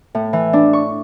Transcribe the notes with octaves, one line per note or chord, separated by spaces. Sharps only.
A2
E3
D4
C#6